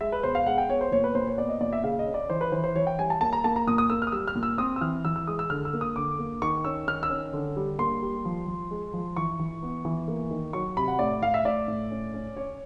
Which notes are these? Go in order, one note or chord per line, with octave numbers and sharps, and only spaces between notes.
G#3 E5
B4
B2 C5
F5
G#3 F#5
G5
B3 C#5
C5
A#2 C#5
B4
A#2 C5
C#5
B3 D5
D#5
A#2 D5
E5
C#3 F5
D#5
C#4
D5
E3 C5
B4
E3 C5
C5
E3 C#5
G5
G3 G#5
A5
A#3 A5
A#5
A#3 A5
A#5
A#2 D#6
D#6
A#3 E6
F6
D#6
G3 E6
F6
A#2
E6
C4 D#6
E6
E3 F6
E3 E6
E6
G#3 D#6
E6
D3 F6
E6
A#3
D#6
D3 D6
A#3
D#3 C#6
C#4 E6
D#3 F6
E6
C#4
D3
G3
A#3 C6
G3
F3
F3
G#3
F3
E3 C#6
E3
B3
E3
A#3
D#3
F#3 C#6
C3 B5
F#5
A2 D5
A2 F5
E5
A2 D5
A2
C#4
C#4
C#4 C#5